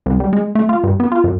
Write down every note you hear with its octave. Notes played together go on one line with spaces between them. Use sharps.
C2
G3
G#3
A3
F4
G2
B3
F4
F#2